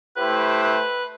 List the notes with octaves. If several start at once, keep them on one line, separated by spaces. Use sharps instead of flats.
A3 E4 G4 B4 C5 G5
B4